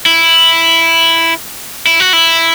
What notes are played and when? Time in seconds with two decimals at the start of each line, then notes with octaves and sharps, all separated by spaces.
0.06 E4
1.87 E4
2.00 F#4
2.13 E4